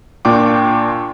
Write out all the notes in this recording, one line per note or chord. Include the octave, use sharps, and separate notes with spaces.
A#2 D4 F4 G5 C#6 D6